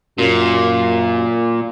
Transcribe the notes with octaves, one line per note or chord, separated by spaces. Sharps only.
F#2 A#2